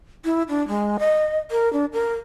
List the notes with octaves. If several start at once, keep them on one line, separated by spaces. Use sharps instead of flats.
E4
D4
G#3
D#5
A#4
D4
A#4